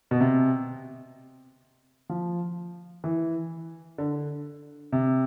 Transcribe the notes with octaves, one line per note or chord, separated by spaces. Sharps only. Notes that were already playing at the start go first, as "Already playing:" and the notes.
B2
C3
F3
E3
D3
C3